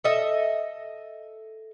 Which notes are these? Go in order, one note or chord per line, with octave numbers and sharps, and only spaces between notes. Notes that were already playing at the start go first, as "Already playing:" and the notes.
A4 D#5 E5